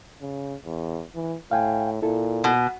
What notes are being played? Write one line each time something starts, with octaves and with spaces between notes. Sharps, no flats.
C#3
E2
E3
A2 F5 G5 G#5
A#2 E4 A4
B2